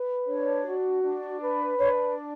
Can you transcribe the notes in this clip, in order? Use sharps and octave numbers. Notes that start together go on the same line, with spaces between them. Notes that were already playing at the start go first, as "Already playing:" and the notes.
Already playing: B4
D4 C#5
F#4
D4
B4
D4 C#5